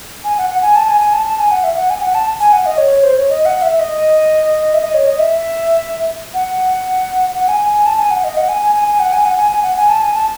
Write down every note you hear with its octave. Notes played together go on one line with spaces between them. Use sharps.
G#5
F#5
F#5
G#5
A5
G#5
G#5
A5
A5
G#5
F#5
E5
F#5
G#5
F#5
A5
G#5
F#5
D#5
C#5
C#5
C5
C#5
D#5
F#5
E5
D#5
E5
D#5
C#5
D#5
E5
F#5
F#5
G#5
G#5
G#5
A5
G#5
F#5
D#5
F#5
G#5
G#5
G#5
G#5
F#5
G#5
F#5
G#5
G#5
F#5
G#5
A5
G#5
A5